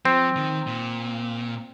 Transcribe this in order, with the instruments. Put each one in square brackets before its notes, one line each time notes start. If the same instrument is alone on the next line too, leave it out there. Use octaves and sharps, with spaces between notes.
[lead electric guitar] F3 [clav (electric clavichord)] C4
[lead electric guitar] D#3
A#2